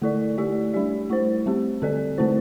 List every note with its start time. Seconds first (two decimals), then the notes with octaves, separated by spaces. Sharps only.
0.02 D3 A3 E4 A4 D5
0.38 A3 E4 G4 D5
0.74 G3 D4 G4 D5
1.10 A3 E4 C5
1.46 G3 C4 G4
1.82 D3 C4 A4 D5
2.18 D3 A3 C4 E4 C5